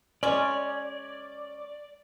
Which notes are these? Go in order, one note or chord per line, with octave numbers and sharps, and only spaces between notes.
G#3 C#4 D5